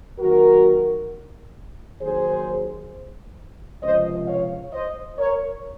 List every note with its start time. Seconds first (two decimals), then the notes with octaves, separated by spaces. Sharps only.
0.20 D#2 D#3 F#3 F#4 A#4
2.01 D#2 D#3 F#3 G#4 C5
3.82 C#2 C3 F3 C5 D#5
4.27 C#5 F5
4.73 C5 D#5
5.18 A#4 C#5